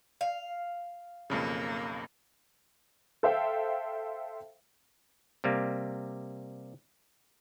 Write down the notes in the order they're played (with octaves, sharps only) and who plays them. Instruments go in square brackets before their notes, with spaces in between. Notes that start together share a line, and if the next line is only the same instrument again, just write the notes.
[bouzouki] F5
[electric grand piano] B1 F2 C#3 [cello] A#3
[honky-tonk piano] A4 C5 E5 F5 G5
[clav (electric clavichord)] C3 G3 A#3